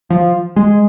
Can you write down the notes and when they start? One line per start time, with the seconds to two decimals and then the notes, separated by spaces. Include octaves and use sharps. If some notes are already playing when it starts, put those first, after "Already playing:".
0.10 F3
0.56 G#3